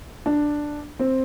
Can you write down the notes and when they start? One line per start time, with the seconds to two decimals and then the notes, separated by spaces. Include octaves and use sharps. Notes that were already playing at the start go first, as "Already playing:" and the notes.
0.26 D4
0.99 C4